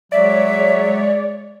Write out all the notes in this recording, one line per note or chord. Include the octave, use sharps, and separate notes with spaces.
F#3 G#3 C#5 D5 E5